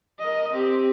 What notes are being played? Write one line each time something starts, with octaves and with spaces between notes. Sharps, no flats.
A#4 D#5
C4 G4